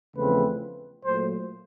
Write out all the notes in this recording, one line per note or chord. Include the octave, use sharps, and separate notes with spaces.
E2 C#3 F3 A3 C4 B4
A#2 F#3 A3 C5